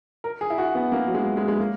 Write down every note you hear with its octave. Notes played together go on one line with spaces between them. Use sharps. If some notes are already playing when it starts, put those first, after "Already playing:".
A#4
G#4
E4
F#4
B3
A#3
F#3
G#3
G#3
G#3
A#3